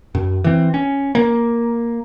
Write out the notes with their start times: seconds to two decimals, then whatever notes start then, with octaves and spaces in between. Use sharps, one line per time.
0.15 F#2
0.44 E3 C4
0.74 C#4
1.15 A#3